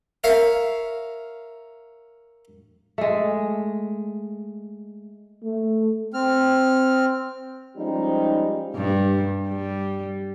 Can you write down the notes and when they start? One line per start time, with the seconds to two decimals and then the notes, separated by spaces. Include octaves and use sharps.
0.24 A#4 C#5 E5 F5
2.98 G#3 A3
5.44 A3
6.14 C4 F6
7.77 F3 G3 G#3 C#4 D#4 G4
8.76 G2
9.48 G3